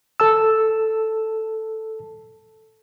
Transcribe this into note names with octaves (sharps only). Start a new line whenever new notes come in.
A4 A5 E6